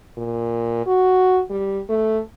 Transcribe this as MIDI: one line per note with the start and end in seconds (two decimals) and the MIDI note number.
0.17 0.86 46
0.86 1.41 66
1.50 1.80 55
1.89 2.20 57